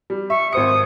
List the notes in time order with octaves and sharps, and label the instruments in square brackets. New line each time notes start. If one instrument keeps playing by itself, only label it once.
[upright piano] G3
[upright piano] E5 [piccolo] C#6
[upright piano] G#1 C5 C#7 [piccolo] D#6